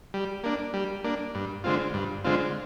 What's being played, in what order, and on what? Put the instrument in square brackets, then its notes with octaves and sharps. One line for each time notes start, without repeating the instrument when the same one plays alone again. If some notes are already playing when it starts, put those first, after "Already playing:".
[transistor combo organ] G3
A#3 D4
G3
A#3 D4
G2
D3 G#3 C4 F4
G2
D3 G#3 C4 F4